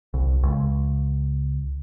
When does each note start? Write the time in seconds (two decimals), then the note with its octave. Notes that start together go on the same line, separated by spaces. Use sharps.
0.14 C2
0.43 C#2